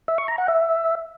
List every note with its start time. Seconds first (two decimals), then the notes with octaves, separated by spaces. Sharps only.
0.08 E5
0.18 C#6
0.28 A#5
0.38 F#5
0.48 E5